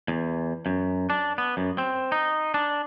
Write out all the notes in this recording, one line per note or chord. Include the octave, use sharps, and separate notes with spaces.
E2
F#2
D4
B3
F#2
C4
D#4
D4